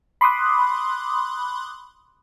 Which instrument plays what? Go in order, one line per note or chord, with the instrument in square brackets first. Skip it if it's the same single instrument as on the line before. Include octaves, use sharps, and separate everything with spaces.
[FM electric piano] B5 C6 D6 D#6 F#6